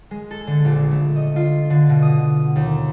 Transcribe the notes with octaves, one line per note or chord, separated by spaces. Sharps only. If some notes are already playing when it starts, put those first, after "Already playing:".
G#3
A4
D3
A#1
A3
D#5
F4
D3
B2
D#6
D#2